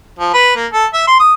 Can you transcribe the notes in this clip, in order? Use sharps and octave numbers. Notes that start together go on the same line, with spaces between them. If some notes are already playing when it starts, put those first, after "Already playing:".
F3
B4
A#3
A4
E5
C6
D#6